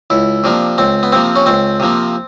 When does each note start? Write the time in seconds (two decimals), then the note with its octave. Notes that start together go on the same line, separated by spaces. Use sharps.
0.10 C#2 E4
0.44 C3 F3 A#3 D4
0.78 C#2 C4
1.03 B3
1.12 C3 F3 A#3 C4
1.36 C#4
1.46 C#2 C4
1.80 C3 F3 A#3